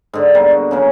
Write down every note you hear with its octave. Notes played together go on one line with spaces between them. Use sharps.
G#2 D3
G3 A#3 B3
F#4
C#3 F#3 A#3